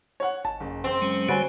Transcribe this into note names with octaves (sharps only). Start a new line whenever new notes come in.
C#5 F#5
G#1 A5
F#1
C4
F#3 G#3 C#4
D3 G3 F#4 B4 C#5 G#5